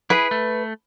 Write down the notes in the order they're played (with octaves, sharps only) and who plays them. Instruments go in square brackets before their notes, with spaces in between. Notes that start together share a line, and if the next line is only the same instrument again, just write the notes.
[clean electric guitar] E4 G#4 [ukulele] B4
[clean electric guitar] A3